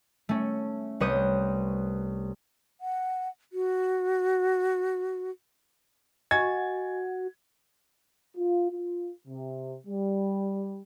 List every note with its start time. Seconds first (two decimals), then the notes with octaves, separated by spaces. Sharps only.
0.29 A3 C#4
1.00 C2 B4 C#5 D#6 G6 D#7
2.81 F#5
3.53 F#4
6.31 F#4 D#5 G#5 G#6 A6
8.37 F4
8.70 F4
9.27 C3
9.87 G3